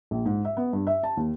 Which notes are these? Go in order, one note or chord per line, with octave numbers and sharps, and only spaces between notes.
A#1
G#2
E5
B3
G2
E5
A5
D#2